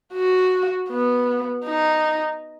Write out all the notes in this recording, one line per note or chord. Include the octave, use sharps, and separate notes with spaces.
F#4
B3
D#4